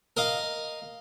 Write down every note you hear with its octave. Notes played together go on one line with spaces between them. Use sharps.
A#4 D#5 F5